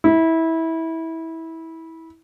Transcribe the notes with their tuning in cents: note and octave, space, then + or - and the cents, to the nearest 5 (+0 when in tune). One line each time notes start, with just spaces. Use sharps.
E4 -20